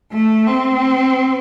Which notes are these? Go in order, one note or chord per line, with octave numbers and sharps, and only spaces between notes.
A3
C4